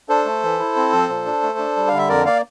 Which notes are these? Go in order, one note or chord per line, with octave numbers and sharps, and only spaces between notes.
D4 A4 C5
A3
E3
E4
C4
F3
A#2
D4
A3
D4
G3
D3 F5
E5
F2 A#4 D5
A#3 D5 F5